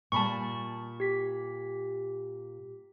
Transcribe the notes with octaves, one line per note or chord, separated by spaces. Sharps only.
A#2 G3 A5 B5 C#6
G4 B6